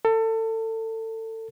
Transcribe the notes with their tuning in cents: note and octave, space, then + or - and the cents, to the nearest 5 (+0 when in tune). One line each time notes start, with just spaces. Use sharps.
A4 +25